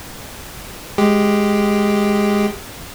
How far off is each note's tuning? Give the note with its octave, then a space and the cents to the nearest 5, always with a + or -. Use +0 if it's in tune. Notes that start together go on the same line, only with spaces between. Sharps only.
G#3 +0 G4 +0